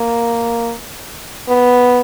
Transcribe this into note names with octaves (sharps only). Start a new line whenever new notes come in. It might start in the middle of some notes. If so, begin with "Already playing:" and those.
Already playing: A#3
B3